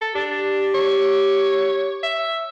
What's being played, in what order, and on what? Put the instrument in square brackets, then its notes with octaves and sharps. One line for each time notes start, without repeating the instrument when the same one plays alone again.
[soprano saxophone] A4
[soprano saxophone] D4 [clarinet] G4
[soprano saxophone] C#5
E5